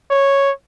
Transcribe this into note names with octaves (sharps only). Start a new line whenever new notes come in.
C#5